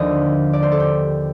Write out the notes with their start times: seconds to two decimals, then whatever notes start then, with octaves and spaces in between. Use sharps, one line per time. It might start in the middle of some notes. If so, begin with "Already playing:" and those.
Already playing: D#2 D3 F3 D#5
0.53 D5
0.62 C5
0.72 A4
0.80 G4